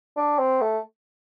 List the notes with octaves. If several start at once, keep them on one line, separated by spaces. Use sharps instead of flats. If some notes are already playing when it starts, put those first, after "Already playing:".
D4
C4
A3